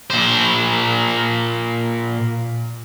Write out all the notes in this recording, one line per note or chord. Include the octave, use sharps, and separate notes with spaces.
A#2 C5